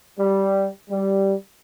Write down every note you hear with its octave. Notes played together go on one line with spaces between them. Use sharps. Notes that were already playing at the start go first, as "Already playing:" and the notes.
G3
G3